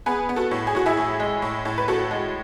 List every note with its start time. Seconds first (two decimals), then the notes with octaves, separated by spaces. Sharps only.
0.06 B3 G#4 B4
0.29 B3
0.36 F#4 A4
0.51 A2
0.67 G#4
0.75 A2 F#4
0.86 E4 G#4
0.97 A2
1.20 G#3
1.42 A2
1.65 A2
1.78 B4
1.88 A2 F#4 A4
2.11 G#3